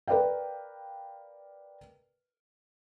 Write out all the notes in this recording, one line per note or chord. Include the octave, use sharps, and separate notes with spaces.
A#4 B4 D5 F5 G5